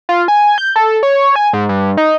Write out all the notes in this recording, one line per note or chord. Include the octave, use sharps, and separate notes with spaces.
F4
G#5
G6
A4
C#5
G#5
G#2
G2
D#4